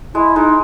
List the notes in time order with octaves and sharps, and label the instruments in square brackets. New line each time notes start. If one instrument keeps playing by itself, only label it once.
[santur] G#3 [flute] E4
[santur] G#3 [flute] D#4